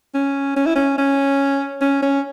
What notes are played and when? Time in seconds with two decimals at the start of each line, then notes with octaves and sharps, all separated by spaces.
0.14 C#4
0.56 C#4
0.66 E4
0.75 C#4
0.98 C#4
1.81 C#4
2.02 C#4